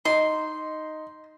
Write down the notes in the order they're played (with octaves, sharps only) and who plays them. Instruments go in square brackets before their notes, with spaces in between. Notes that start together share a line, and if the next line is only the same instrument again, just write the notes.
[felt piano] D#4 [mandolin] C6